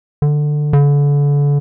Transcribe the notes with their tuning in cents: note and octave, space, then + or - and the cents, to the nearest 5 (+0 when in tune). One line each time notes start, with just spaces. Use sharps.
D3 +15
D3 -35